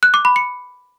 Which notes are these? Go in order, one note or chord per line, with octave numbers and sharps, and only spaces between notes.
F#6
D6
B5
C#7